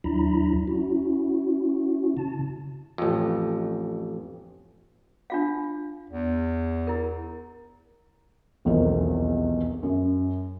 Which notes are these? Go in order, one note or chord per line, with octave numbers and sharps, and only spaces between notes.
D#2 F#3 D4 E4 A#5 B5
C#4 E4 F#4
C#3 A5
A1 F2
D4 F4 F5
E2
E4 A#4
D#1 B1 E2 C4 A#4
F#2